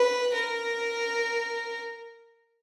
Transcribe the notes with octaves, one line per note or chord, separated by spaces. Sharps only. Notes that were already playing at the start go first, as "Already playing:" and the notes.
Already playing: B4
A#4